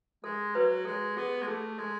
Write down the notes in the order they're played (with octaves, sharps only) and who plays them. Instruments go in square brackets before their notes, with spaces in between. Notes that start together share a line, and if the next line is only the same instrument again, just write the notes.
[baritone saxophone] G#3 [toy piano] A4
[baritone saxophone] F#3 [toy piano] B4
[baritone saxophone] G#3 [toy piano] A4
[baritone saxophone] B3 [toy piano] G#4
[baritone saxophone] G#3
[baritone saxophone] A3 [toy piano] G#4
[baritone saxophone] G#3 [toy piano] A4